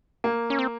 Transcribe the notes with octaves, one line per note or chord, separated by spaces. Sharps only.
A#3
C#4
C4